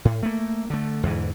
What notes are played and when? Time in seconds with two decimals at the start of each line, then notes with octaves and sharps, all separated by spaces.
0.05 A2
0.23 A3 A#3
0.70 D3 A3
1.03 E2 G#2 D3 E3